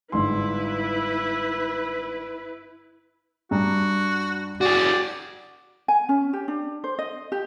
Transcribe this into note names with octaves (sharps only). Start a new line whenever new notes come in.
G1 G#2 E4 B4 C6
G2 F#4 A#5
F#4 G#4 D5
G#5
C#4
G4
D4
C5
D#5
G4